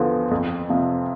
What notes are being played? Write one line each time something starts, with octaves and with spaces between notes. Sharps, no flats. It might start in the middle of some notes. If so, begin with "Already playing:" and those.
Already playing: E2 D3 F3 B3
F2
C3 F3